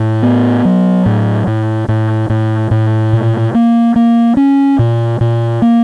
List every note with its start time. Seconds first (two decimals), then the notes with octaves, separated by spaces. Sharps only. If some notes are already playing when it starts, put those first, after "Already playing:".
Already playing: A2
0.23 B3
0.65 F#3
1.06 A2
1.47 A2
1.88 A2
2.30 A2
2.71 A2
3.13 A#2
3.54 A#3
3.96 A#3
4.37 C#4
4.79 A#2
5.21 A#2
5.62 A#3